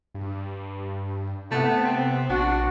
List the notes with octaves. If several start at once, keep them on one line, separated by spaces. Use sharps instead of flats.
G2
C3 A3 B3
C4
A#1 D4 F#4